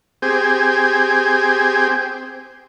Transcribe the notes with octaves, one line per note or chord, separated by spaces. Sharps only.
C4 G4 G#4